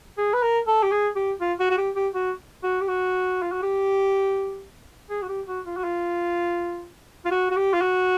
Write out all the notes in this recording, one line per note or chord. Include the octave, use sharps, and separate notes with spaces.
G#4
B4
A#4
A4
G4
G#4
G4
F4
F#4
F#4
G4
G4
F#4
F#4
G4
F#4
F4
F#4
G4
G#4
F#4
G4
F#4
F4
F#4
F4
F4
F#4
F#4
G4
F4
F#4